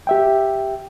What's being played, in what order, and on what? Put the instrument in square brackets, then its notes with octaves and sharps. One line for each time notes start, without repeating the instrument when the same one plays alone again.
[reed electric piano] G4 E5 G5